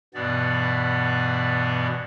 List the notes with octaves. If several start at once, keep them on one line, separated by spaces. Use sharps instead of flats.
G2 B2 E3 B3 D5